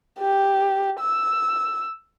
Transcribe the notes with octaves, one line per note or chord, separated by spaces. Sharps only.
G4
E6